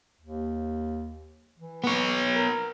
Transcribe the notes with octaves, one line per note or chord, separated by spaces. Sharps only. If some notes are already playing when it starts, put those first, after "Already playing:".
D#2
E3
B3 C#5
A#4